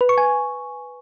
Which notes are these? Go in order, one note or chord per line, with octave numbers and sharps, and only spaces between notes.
B4
C#6
G#5